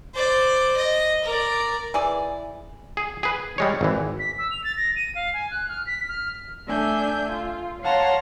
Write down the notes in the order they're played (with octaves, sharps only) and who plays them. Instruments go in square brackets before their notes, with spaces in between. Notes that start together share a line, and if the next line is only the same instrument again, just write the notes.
[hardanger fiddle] C5 D5
D#5
A#4 D5
[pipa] E3 G#4 D5
[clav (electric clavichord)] G#4
G#4 B4
G3 G#3 C#5
G#1 E3
[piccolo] B6
E6
F7
A6
A#6
D#7
F5
G#5
F#6
F6
B6
F6
[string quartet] A3 D4 E5 G#5 G6
F4
C#5 F5 F#5 A5 A#5 C6